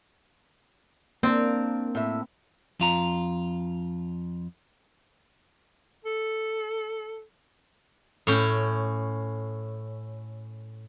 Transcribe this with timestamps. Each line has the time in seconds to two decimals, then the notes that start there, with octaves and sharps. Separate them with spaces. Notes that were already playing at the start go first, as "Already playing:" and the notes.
1.23 A#3 C4 D4 A#4
1.95 A2 E5
2.80 F2 F4 A#5
6.05 A4
8.27 A2 C#4 G5